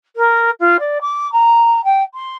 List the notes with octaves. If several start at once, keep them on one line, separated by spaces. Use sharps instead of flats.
A#4
F4
D5
D6
A#5
G5
C6